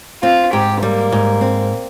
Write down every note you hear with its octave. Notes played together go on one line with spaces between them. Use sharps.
C4 F4
G#2 G4
G3 A#3
G#2
C4